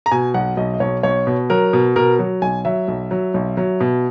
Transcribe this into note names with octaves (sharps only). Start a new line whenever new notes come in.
A#5
B2 G#5
B1 F#5
B1 D#5
D#5
B1 C#5
B1 C#5
B2
F#3 A#4
B2
B2 A#4
F#3
B1 G#5
F#3 E5
B1
F#3
B1
F#3
B2